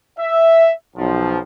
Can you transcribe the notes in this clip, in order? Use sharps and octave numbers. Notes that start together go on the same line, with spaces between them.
E5
B1 F3